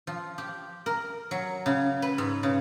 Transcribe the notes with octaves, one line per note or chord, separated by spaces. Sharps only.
F3
G4
A#4
F#3
C#3
B4
G#2
C#3